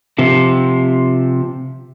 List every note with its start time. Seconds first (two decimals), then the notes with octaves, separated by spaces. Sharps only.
0.18 C3 F3